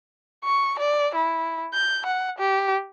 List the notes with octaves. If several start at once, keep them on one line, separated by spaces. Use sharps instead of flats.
C#6
D5
E4
G6
F#5
G4